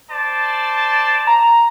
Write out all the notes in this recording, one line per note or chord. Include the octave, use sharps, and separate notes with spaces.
C5 D5 A5
A#5